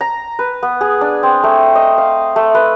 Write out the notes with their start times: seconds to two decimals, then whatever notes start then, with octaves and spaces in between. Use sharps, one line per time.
0.01 A#5
0.39 B4
0.63 B3
0.81 G#4
1.01 D4
1.23 C4
1.43 A3
1.75 D#5
1.98 F5
2.36 A3
2.55 B4